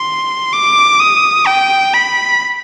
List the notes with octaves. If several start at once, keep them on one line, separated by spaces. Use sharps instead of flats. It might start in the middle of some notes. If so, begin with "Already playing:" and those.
Already playing: C6
D6
D#6
G5
B5